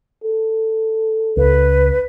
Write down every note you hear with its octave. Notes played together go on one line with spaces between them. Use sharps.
A4
C#2 B4